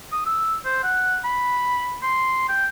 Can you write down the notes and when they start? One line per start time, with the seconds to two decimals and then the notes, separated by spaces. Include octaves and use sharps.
0.12 D#6
0.26 E6
0.65 C5
0.83 F#5
1.24 B5
2.03 C6
2.49 G5